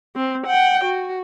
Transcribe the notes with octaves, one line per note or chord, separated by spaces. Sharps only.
C4
F#5 G5
F#4